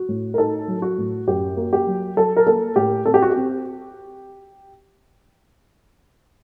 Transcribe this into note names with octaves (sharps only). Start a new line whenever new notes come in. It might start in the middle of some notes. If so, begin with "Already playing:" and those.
Already playing: F#4
A2
A#4
D#4 A4
F#3
F#4
A2
F#2 G4
A#3
G4
F#3
F#3 A4
A#4
A#3 A4
A2 G4
C4 A4
G4
F#4
G4
C4